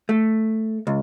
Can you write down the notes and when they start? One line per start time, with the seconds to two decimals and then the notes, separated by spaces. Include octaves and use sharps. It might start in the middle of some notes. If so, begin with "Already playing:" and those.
0.09 A3
0.87 C#2